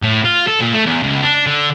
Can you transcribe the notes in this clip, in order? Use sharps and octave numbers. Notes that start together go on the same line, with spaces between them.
A2
F4
A4
A#2
A3
E2
C#2
D4
D3